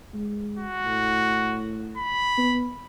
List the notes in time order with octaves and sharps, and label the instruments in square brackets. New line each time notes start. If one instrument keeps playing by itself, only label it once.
[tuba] G#3
[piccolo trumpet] F#4
[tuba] A2
[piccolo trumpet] B5
[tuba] B3